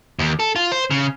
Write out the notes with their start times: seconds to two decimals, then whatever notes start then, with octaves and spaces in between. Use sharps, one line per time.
0.19 D#2
0.40 A4
0.56 F4
0.72 C5
0.91 C#3